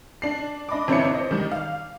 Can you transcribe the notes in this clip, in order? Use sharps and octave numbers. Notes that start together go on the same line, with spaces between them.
D4 C7
D4 D#5 B5 D6
G1 C4 D4 E4 C#5 C#7
C5 D#5
D#3 G3
F5